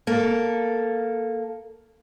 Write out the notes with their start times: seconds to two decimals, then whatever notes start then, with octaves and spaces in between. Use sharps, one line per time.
0.07 A#3 A4